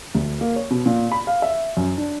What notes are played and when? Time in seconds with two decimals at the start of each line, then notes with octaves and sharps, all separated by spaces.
0.15 D2
0.41 A#3
0.56 C#5
0.71 B2
0.86 A#2
1.12 B5
1.27 F5
1.42 E5
1.77 F#2
1.98 D4